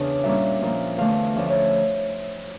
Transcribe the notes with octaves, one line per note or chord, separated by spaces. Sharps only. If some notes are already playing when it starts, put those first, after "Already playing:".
Already playing: E2 C#3 D4 F5
A#2 G3 A#3 C#4 E5
A#2 F3 A#3
E2 D3 A3 F5
D2 D3 F3 C#4 E5
C#5 E5